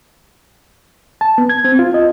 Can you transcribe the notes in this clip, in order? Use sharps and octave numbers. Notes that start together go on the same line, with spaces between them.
A5
B3
G#6
C4
F4
D#5